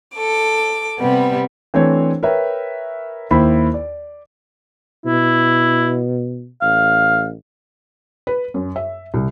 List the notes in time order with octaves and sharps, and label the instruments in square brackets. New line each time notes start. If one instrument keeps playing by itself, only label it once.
[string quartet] A4 D6
C3 G3 B3
[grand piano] E3 A3 C4 D4 C5 C#5
A#4 B4 C#5 E5 G5
D#2 E4 C5 B5
D5
[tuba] B2 [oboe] E4
[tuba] A1 [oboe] F5
[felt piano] B4
F#2
E5
C2